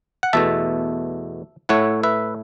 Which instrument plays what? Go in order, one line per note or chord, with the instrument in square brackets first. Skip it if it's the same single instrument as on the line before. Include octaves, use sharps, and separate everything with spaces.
[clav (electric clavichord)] F#5
E2 B2 A3 E5 A5
A2 A3 E4 C#5 F#5
B4 E5